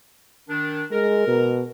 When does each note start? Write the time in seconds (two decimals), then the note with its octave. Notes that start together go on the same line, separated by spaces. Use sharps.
0.49 D#3 D4
0.92 G#3 A#4
1.27 B2